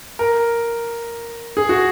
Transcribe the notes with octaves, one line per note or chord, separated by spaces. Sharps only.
A#4
G#4
F#4